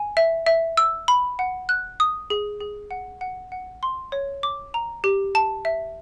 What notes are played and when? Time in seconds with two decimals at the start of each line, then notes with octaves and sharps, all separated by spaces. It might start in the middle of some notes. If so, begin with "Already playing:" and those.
Already playing: G#5
0.17 E5
0.46 E5
0.77 E6
1.08 B5
1.39 F#5
1.69 F#6
2.00 D#6
2.30 G#4
2.60 G#4
2.91 F#5
3.21 F#5
3.52 F#5
3.83 C6
4.12 C#5
4.43 D6
4.74 A#5
5.04 G4
5.35 A5
5.65 E5